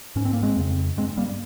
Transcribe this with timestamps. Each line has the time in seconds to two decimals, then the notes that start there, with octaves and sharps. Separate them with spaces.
0.16 G#2 C#4
0.25 C4
0.33 A#3
0.43 G#3 C4
0.56 F2 C#3
0.97 G2 G#3 C4
1.17 G3 A#3